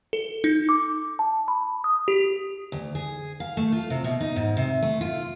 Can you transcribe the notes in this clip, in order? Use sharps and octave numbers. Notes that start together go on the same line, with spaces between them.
A4
D#4
D6
A5
B5
D#6
G4
D2
G#4
F5
A3
F4
C3
B2
D#4
G#2
C3
A3
F4